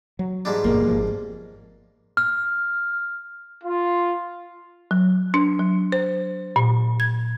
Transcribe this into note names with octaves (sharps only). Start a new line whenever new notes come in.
F#3
G#2 G3 D4
G1 F2 B2 A#3
G#1 F3
F6
F4
F#3
D4
F#3
C5
A#2
G#6